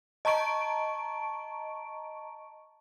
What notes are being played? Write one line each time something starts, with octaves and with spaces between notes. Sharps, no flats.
D#5 A5 A#5 C#6 D7